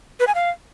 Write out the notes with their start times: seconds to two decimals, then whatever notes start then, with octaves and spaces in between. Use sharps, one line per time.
0.20 B4
0.27 G#5
0.35 F5